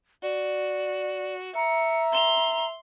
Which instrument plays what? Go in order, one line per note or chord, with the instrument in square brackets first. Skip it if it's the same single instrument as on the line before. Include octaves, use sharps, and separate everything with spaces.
[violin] F#4 [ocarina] D5
[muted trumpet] E5 [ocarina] A#5 [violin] C#7
[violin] C6 F7